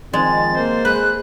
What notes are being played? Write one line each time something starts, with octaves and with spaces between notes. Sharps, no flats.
D#3 F3 G#3 C4 A6
A#3 C5
G#3 B4 F#6